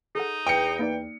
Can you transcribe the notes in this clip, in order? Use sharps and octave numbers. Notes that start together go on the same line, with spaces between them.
D#4 G#4 A4 F#5
E2 G5 C#7
A#3 D#4 D5